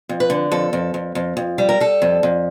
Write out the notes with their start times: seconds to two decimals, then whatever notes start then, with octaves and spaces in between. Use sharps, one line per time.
0.09 F2
0.20 B4
0.30 D3
0.52 F2 A4
0.73 F2
0.94 F2
1.15 F2
1.37 F2
1.58 G3
1.69 A#4
1.80 G3 A4
2.02 F2
2.23 F2